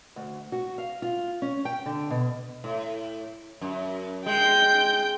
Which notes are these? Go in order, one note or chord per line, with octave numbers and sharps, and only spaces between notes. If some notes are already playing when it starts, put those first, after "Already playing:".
D2
F#4
F5
F4
C#4
G5
D3
B2
A2
F#2
G#3 G5 G6